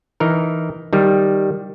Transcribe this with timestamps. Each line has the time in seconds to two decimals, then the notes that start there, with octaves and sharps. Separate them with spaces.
0.20 E3 D#4 A#4
0.93 D#3 G3